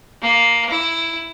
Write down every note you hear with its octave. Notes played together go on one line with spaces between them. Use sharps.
A#3
E4